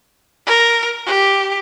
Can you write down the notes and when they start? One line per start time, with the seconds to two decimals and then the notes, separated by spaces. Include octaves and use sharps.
0.46 A#4
1.06 G4